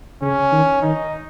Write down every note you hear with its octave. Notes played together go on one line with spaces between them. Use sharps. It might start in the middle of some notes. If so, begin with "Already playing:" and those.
C#3 C#4
D#3
D#3 D#4